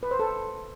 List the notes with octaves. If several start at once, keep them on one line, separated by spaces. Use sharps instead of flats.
B4
C5
A4